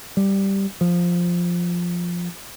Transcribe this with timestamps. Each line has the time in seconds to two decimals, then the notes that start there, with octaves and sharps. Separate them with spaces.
0.17 G3
0.81 F3